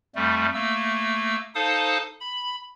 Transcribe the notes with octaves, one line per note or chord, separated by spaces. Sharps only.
F2 G3 A3
A3 A#3 E6
D#4 A4 C5 F5 A5 D#6
B5